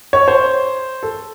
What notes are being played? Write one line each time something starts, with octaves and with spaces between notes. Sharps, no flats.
C#5
C5
A4